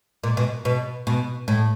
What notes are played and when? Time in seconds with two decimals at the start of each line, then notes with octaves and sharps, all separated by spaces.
0.23 A#2
0.37 B2
0.65 B2
1.07 B2
1.48 A2